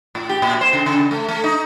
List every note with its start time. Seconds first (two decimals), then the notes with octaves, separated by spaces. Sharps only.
0.15 A2
0.29 G4
0.42 A#2
0.61 C5
0.73 C#3
0.86 C#3
1.11 A3
1.29 A3
1.44 D#4